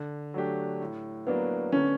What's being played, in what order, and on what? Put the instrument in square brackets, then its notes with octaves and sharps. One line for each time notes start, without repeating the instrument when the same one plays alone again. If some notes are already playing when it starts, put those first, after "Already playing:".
Already playing: [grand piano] D3
F#3 A3 D4 G4
A2
[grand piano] F#3 A#3 D4 [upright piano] B3
[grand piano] D3 [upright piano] C#4